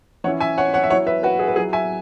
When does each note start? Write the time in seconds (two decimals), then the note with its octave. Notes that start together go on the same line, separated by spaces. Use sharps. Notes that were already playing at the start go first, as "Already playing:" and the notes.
0.24 E3 C#4 E4 C#5 F#5
0.40 E5 G#5
0.58 C#5 F#5
0.74 C#5 F#5
0.84 E5
0.90 F#3 E4 C#5 F#5
1.06 B4 E5
1.23 F#4 B4
1.39 G#4
1.48 B4
1.56 F#3 E4 G#4
1.73 E5 G#5